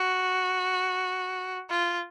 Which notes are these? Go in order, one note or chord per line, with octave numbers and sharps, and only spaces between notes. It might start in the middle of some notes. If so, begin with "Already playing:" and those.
Already playing: F#4
F4